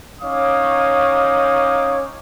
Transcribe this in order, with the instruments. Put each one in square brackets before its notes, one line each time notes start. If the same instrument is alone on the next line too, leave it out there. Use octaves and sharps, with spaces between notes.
[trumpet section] C#4 D#4 C#5 F5 D6 D#6